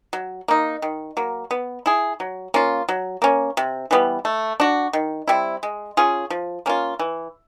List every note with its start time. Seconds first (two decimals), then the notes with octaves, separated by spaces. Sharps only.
0.13 F#3
0.48 A#3 D#4
0.82 D#3
1.17 F#3 A#3
1.51 B3
1.86 E4 G#4
2.20 F#3
2.54 A#3 C#4 F4
2.89 F#3
3.22 A#3 C#4
3.57 C3
3.91 E3 G3 B3
4.25 A3
4.60 D4 F#4
4.93 D#3
5.28 G3 C4 E4
5.63 G#3
5.97 C#4 F4 G#4
6.30 F3
6.66 A#3 C#4 F4
6.99 E3